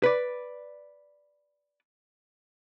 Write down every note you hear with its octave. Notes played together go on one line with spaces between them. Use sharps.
B4 D5